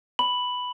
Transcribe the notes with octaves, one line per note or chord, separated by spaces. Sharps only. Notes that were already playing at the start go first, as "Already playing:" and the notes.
B5 F#7